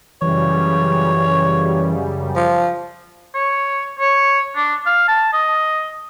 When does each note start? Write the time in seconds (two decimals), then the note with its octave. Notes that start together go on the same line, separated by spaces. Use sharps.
0.22 F#2 C#3 E3 G3 C#5
2.36 F3
3.35 C#5
3.99 C#5
4.56 D4
4.86 F5
5.08 A5
5.33 D#5